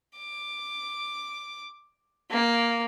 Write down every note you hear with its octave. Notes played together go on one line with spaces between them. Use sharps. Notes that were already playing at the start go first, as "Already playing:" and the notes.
D6
A#3